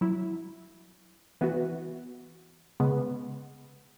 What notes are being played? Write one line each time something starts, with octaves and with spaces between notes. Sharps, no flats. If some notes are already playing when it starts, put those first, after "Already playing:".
F#3 E4
E3 B3 F#4
C#3 G#3 B3